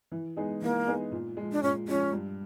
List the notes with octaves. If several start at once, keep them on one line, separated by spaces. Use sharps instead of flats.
E3
G#3 B3 D#4 G#4
E3 A#3
G#3 B3 D#4 G#4
A#2
F3 G#3
D4
A#2 C#4
F3 G#3 C#4
G2